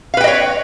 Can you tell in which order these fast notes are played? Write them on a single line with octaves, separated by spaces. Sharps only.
F5 B4 G5 D#5 C#5